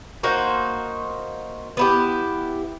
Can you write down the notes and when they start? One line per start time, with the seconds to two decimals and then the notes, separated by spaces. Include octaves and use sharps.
0.23 A#3 D#4 F#4 C5
1.77 B3 E4 G4